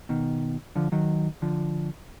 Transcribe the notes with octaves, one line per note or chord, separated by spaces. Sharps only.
B2 D#3
D3 F3
D#3 F#3
D3 F3